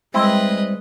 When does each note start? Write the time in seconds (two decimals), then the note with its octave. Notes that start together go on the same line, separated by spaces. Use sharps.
0.14 G3 G#3 C4 E4 B4 D#5